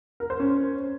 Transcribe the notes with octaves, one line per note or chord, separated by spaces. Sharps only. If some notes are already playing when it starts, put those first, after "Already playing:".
A#4
C5
C#4